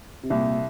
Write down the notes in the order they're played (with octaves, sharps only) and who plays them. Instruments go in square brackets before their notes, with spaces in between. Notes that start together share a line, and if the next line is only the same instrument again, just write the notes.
[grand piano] C3
[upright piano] C2 [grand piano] A#2